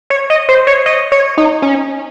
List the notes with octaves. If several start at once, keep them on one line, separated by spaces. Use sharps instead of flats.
C#5
D#5
C5
C#5
D#5
C#5
D#4
C#4